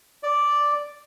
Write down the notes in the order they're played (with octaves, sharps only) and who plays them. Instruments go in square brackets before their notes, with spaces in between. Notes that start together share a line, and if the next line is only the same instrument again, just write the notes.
[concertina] D5